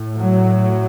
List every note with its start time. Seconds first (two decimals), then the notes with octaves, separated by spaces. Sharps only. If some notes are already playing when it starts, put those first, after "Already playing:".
Already playing: A2
0.21 F#3